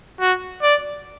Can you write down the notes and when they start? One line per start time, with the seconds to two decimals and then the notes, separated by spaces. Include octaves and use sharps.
0.20 F#4
0.63 D5